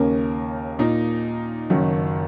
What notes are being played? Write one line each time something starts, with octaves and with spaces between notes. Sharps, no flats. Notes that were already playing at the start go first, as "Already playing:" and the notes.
Already playing: D#2 C#3 A#3 C#4 A#4
A#2 A#3 D#4
F#1 F#2 D#3